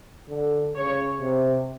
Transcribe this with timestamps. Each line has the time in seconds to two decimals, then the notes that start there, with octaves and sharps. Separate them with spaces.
0.29 D3
0.75 C#3 C#5
1.21 C3